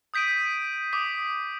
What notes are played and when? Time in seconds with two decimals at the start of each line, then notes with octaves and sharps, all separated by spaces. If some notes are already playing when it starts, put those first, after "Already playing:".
0.14 D#6 G6 B6 D7 D#7
0.93 D6 D#6 B6